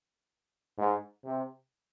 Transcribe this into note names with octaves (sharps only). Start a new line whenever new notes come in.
G#2
C3